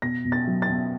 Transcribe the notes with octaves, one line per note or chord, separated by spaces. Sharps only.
B2 A#6
B2
A6
F#3
A6
B2